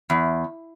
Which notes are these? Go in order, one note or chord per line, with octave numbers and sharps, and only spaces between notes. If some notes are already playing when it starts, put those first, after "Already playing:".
E2